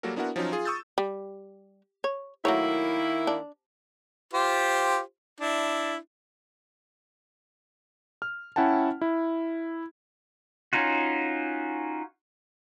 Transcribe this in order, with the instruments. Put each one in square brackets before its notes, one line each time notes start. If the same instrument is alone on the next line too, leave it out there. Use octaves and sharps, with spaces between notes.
[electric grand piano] F#3 G3 A#3 F#4 A4 A#4
B3 D4 E4 F#4 A#4 F#5
F3 F#3 C#4 D#4 F4
F4 G#4
C#6 D#6 E6 G6 A6
[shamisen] G3
C#5
[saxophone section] D#3 A#3 E4 [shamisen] F#3 A3 C#5
[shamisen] D4
[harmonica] F4 G4 C5
D4 E4
[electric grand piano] F6
C#4 E4 F#5 G5 A5
E4
[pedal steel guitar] C#4 D#4 F4 F#4